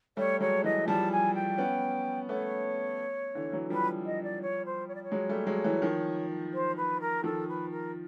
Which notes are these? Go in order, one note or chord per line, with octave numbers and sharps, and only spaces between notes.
G3 A3 C#5
F#3 G#3 C#5
E3 F#3 D#5
F3 G3 A5
G#5
G5
B3 C#4
A3 B3 C#5
D3 E3
E3 F#3
F3 G3 B4
D#5
D5
C#5
C5
C#5
D5
C#5
F#3 G#3
G3 A3
F#3 G#3
E3 F#3
D#3 F3
C5
B4
A#4
D#3 F3 A4
B4
A#4